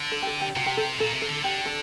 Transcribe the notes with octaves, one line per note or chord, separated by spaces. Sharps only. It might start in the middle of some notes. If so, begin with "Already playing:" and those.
Already playing: D3
A4
G4
A4
G4
C3 F#4
G4
A4
A#2 A4
C3
A4
D3
D3 G4
A4